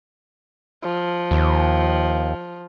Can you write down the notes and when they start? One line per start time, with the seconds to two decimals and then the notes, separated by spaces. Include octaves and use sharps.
0.83 F3
1.31 D#2